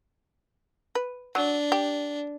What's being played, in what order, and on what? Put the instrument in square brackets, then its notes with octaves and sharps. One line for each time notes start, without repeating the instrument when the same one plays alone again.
[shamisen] B4
[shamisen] F#3 [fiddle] D4
[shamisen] G4